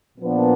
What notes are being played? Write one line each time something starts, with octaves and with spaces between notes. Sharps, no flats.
A#2 F3 B3 D4